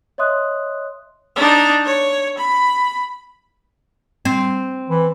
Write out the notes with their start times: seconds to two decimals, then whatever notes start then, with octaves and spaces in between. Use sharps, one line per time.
0.18 C#5 D#5 E5 C6 D#6 F#6
1.36 D4 D#4
1.85 C#5
2.38 B5
4.25 C4
4.90 E3